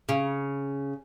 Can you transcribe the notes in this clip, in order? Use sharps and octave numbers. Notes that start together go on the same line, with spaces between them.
C#3